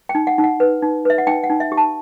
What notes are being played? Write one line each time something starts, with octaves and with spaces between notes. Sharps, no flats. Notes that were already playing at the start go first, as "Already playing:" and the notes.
G5
D#4
F#5
D#4
F#5
B4
D#4
B4 E5
F#5
D#4 G5
F#5
D#4
E5
G4
A5